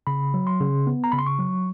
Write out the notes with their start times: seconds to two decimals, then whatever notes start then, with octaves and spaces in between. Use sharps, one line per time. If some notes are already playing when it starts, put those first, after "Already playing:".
0.07 C#3 B5
0.34 F#3
0.47 C6
0.60 C#3
0.87 B3
1.04 A#5
1.12 C#3 B5
1.19 C6
1.27 C#6
1.39 F#3